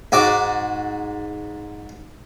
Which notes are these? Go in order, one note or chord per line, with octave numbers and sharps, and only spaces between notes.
G#2 F#4 D6